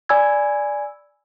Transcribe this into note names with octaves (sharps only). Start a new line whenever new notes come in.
D5 G#5 B5 E6 G#6